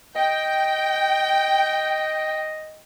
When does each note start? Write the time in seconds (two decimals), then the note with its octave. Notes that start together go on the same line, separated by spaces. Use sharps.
0.16 D#5 G5